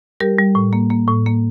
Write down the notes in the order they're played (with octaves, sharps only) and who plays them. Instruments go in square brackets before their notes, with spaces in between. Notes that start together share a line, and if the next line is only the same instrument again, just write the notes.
[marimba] G3 G4 A#4
G3
A2
A#3
A#3
A2
A#3